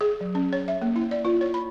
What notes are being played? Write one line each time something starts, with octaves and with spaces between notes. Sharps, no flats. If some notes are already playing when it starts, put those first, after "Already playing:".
G#4
F#3
C#4
C#5
E5
A#3
E4
D5
F4
C#5
B5